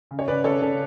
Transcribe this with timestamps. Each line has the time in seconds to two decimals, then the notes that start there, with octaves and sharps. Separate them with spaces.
0.11 C#3
0.19 C#5
0.28 C#3 B4 D5
0.44 C#3 A4 C#5
0.61 C#3 A4